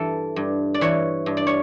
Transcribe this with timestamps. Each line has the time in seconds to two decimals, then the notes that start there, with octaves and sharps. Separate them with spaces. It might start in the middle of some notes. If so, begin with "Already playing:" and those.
Already playing: G2 E3 A4
0.36 G2
0.74 D5
0.81 E3 C#5
1.26 G2
1.37 D5
1.47 C#5